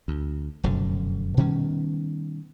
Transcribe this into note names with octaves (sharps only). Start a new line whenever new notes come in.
D2
F1 F#2 B2 D3
B2 D#3 G3 C#4